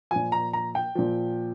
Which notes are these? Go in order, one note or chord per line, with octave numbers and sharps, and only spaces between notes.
A#2 F3 G#5
A#5
A#5
G5
A#2 F3